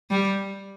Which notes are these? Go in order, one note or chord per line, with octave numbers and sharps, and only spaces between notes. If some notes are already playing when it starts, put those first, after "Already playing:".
G3